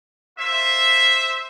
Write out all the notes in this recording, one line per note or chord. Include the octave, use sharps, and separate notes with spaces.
A#3 F4 C5 E5